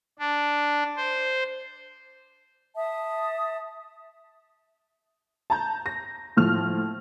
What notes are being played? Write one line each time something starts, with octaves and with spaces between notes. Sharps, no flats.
D4
C5
E5 A5 D#6
A5 A#5 G6
A#6
A2 F3 F6 F7